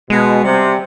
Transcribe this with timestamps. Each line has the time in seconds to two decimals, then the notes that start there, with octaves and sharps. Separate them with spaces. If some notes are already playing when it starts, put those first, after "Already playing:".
0.10 B2 G#3
0.44 C3 G3